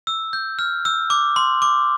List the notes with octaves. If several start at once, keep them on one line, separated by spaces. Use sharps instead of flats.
E6
G6
F6
E6
D6
C6
D6